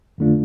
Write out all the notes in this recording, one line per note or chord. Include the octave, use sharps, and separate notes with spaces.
F2 D3 A3 D4 F4